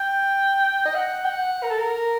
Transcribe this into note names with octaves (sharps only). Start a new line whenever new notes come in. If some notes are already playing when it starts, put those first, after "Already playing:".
Already playing: G5
D#5
F#5
G5
F#5
A#4
A4
A#4